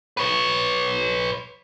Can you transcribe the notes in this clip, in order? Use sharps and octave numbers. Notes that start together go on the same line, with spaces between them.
B4 C#5